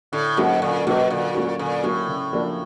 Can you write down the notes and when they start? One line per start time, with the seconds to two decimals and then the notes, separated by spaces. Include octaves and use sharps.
0.12 A2 D3
0.37 G#2 F#3 A#3 C#4 F#4
0.61 A#2 D3
0.87 B2 F#3 A#3 C#4 F#4
1.10 A#2 D3
1.35 F#3 A#3 C#4 F#4
1.59 A#2 D3
1.84 A2 F#3 A#3 C#4 F#4
2.08 C#3
2.33 F3 A#3 D4 F#4